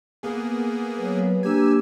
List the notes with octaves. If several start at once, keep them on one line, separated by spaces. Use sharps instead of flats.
A#3 B3 G#4
F#3 B4
A#3 D4 G4 G#5 E6